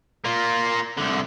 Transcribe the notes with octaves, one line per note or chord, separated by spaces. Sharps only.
A#3 F4
C2 D3